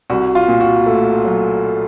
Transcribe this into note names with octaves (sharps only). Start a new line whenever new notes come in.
C2 F#4
F4
A#2
F#4
A3
F#3